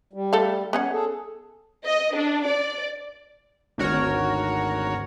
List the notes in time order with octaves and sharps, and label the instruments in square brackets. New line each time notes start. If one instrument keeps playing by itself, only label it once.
[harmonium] G3
[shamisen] A3 A4 F5
B3 C#4 F#5
[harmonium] G#4 A4
[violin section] D#5
D4
D5
[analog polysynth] G#1 D2 F#4 A#4 C#5